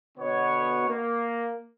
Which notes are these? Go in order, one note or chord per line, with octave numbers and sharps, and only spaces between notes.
B2 D3 B3 C#5
A#3